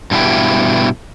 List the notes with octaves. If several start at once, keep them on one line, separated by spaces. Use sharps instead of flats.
G2 B2 B3 E4 G4